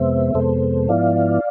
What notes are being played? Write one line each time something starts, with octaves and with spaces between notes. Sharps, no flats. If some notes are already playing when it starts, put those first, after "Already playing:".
Already playing: F2 C3 G#3 B3 C5 E5
F2 C3 G#3 B3 A4 C5
G#2 F3 B3 E4 D5 F5